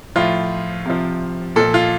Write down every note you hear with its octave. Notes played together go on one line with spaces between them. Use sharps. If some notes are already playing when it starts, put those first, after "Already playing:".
A2 F3 F4
C3 F3
A#2 F3 A4
F4